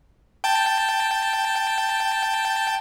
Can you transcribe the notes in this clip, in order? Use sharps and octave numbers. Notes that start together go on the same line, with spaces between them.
G5 A5